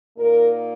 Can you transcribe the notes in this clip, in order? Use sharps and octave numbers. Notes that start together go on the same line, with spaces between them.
A#2 A#3 D#4 A#4